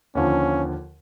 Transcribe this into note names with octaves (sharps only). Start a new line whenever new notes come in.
D#2 D3 F3 C#4